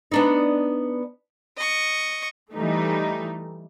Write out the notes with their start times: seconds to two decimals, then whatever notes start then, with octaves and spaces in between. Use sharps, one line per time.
0.12 B3 D4 D#4
1.57 D#5 C#6
2.55 E3 G3 A3 D#4